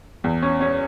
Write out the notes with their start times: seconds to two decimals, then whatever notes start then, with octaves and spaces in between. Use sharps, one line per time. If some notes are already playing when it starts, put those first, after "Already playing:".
0.24 E2
0.42 C#4
0.61 C#4